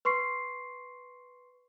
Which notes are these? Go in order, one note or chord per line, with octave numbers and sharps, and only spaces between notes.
B4 C6 C#6 C7